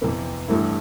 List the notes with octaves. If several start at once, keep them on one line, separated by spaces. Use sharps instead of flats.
F2 C3 E3 B3
A1 G2 E3 A3 E4